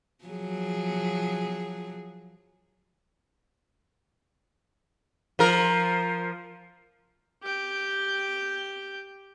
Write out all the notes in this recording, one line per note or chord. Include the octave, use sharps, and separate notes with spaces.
F3 F#3 G#4
F3 A#4
G4 G5